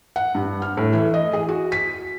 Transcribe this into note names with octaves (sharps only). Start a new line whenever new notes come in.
F#5
G2
F6
A2
E3
D#5
G#4
F#4
B6